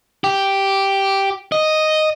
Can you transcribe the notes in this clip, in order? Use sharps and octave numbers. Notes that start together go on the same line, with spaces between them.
G4
D#5